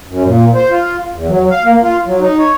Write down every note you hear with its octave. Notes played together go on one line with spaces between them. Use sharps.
F#2
A#2
C5
F4
E2
F#3
F5
A#3
F4
F#3
D#4
C#5